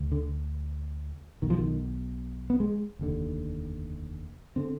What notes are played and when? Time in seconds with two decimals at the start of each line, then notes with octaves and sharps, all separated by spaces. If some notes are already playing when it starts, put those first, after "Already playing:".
Already playing: D2
0.12 D3
1.42 B1 B2 D#3
1.50 F3
1.58 D#3
2.50 B3
2.60 G#3
2.99 F1 D#2 D3
4.56 D3 C4